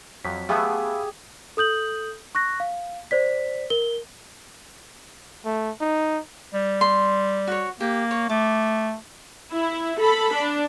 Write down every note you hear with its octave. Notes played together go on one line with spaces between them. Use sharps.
F2 F#3 B6
A3 B3 G4 G#4 E5 F5 B5 E6
A4 D#6 G6 F#7
C#6 F#6 A#6
F5
C5 D5 B6
A#4 G7
A3
D#4
G3
C6
F#4 C#5
A#3 G4
C#5
A3 D6
E4
A4 B5
D4